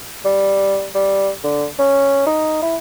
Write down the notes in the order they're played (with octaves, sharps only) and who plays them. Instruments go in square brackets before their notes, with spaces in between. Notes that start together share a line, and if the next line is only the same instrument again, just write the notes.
[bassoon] G3
G3
D3
C#4
D#4
E4